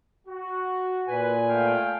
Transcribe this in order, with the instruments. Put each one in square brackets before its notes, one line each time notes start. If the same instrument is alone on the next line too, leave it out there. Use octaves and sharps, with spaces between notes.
[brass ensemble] F#4
[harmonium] A#2 G#5 [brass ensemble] B4
[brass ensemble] A3 F5 G5